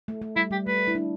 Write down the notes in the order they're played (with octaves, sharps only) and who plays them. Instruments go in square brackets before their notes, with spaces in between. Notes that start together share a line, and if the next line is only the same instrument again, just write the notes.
[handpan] A3
A3
[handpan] G3 [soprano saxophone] E4
[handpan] G3 [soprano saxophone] G4
[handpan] A3 [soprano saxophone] B4
[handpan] E4
D4